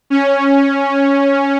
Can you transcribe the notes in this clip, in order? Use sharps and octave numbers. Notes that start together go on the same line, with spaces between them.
C#4